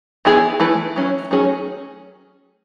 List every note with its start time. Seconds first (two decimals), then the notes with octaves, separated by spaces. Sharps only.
0.25 E3 B3 E4 G#4
0.60 E3 A3 E4 B4
0.96 F#3 C#4 E4
1.31 D#3 F#3 A3 C#4 G#4